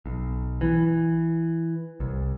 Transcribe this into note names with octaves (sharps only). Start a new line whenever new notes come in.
B1
E3
C2